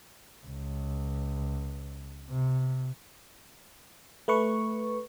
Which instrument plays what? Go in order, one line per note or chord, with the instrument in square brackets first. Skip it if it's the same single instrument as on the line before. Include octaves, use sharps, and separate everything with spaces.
[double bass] C#2
C3
[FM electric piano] A3 B4 C#6